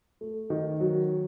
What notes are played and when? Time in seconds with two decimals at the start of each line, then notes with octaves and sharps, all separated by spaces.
0.21 A3
0.50 D#3
0.80 F#3